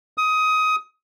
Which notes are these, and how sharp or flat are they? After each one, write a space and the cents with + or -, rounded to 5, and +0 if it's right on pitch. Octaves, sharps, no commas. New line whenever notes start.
D#6 +20